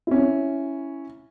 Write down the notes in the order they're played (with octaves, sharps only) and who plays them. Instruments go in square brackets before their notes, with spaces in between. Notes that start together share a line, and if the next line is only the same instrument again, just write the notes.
[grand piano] C#4 E4